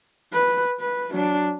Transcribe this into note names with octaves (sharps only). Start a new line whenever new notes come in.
B4
B4
F#3 D4